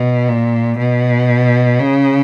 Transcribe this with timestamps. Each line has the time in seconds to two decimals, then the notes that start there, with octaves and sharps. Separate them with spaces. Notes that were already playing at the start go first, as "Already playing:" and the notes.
Already playing: B2
0.29 A#2
0.78 B2
1.80 C#3